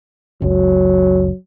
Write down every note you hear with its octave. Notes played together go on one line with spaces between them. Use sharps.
F#1 C#2 F#3